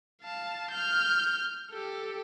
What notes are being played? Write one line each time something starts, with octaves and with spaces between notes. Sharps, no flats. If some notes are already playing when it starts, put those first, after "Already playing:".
F5 A5
F6 G6
G4 A4